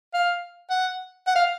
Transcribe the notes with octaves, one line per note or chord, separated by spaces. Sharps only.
F5
F#5
F#5
F5